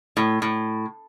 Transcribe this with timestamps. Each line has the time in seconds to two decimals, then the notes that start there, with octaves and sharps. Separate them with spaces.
0.17 A2
0.42 A2